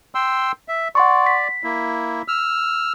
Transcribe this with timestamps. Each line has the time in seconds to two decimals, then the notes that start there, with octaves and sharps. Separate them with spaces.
0.15 G5 C6 E6
0.68 E5
0.95 D5 F#5 C6 C#6
1.26 B6
1.64 A#3 E4
2.28 E6 F6